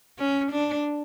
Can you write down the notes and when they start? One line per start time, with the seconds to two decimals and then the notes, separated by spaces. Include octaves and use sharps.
0.18 C#4
0.52 D4